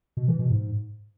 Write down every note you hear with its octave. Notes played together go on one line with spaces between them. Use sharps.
B2
E3
B2
G#2